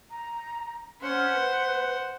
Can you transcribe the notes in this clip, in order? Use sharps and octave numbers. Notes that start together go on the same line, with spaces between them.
A#5
C#4 C5 F#5
B4